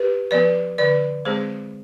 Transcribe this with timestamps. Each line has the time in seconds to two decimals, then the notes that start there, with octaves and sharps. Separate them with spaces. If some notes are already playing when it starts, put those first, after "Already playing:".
Already playing: G4 B4
0.31 F3 B3 B4 D5
0.78 D3 B4 D5
1.25 G#3 C4 G#4 C5